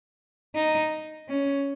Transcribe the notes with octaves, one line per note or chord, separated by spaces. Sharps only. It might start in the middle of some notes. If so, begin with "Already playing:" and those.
D#4
C#4